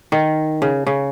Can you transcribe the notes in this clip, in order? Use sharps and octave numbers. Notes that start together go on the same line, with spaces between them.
D#3
C#3
C#3